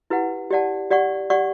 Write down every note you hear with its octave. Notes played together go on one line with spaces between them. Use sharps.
E4 G4 B4 F#5
G4 D5 F#5 A5
G4 D5 F#5 C#6
G4 D5 F#5 C#6